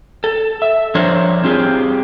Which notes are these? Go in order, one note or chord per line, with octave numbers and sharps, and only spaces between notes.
A4
E5
F3 D4 A#4 C5 C#5
C4 F4 G4 G#4